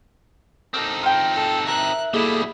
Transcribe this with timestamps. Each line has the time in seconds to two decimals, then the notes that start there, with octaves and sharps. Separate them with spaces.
0.74 C4 D#4 A4 A#4 D6 G6
1.03 F4 G5
1.33 A4
1.67 A#4 E5 F#6
2.14 B2 G3 A#3 E4 G#4 A4 D#5